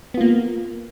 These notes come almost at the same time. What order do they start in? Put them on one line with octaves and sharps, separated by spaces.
B3 F4 A#3